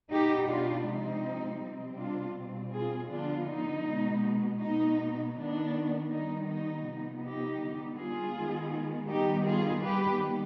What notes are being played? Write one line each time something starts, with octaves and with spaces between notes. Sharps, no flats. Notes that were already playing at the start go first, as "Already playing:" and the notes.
B2 B3 D#4 G4
D4 F4
C3 F3 G#3 C4 D#4
C3 G3 C4
D4 F4
B2 G3 C4
F4 G#4
D3 F3 B3 D4 F4
D#4
B2 G#3 B3
B2 B3 D#4
D#3 B3 D4
D#3 G3 B3 D#4
D#4
C3 F3 B3
D#4 G4
D3 G3 B3
F4 G#4
D#3 G#3 B3
D#3 G3 B3 D#4 G4
F4 G#4
D#3 G3 B3 G4 B4